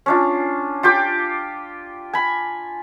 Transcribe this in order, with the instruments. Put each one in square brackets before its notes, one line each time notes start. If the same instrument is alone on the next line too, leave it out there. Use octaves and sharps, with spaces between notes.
[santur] C#4 D4 F4
F4 G4 G5 D6
G#5 B5